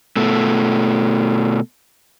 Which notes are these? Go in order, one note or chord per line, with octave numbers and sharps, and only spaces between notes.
B2 A3